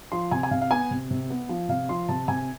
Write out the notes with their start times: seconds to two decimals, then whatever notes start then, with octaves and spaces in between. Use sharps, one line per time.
0.12 F3 C6
0.31 C3 G#5
0.43 G#5
0.51 C3 F5
0.62 F5
0.71 B3 G#5
0.91 C3
1.11 C3
1.30 B3
1.49 F3
1.69 C3 F5
1.89 F3 C6
2.09 C3 A5
2.28 C3 G#5